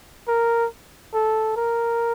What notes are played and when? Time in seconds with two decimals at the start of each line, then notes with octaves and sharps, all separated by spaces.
0.28 A#4
1.14 A4
1.56 A#4